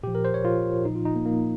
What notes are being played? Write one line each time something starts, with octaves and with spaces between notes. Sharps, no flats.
A#2 F3 G4
A#4
C5
C#5
F4
A#2 F3 D#4
F4
D#4
A#3
A#3